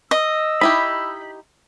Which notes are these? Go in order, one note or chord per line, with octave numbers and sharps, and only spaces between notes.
D#5 E6
D#4 E4 G4 B5